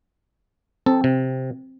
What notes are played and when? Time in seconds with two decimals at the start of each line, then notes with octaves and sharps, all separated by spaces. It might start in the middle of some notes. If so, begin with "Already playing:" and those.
0.86 C4 A4
1.04 C3